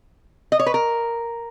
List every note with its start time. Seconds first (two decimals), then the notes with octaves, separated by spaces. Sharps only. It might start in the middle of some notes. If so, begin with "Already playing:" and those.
0.52 D#5
0.60 C#5
0.66 B4
0.74 A#4